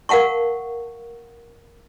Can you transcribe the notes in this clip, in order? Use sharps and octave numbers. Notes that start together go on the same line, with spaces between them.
A#4 F5 F#5 A5 C#6